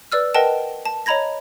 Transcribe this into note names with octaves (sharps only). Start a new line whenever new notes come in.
B4 D5 E6 F6
A#4 B4 D#5 F#5 G5 A5
A5
C#5 D#5 A#5 B5 G#6 A#6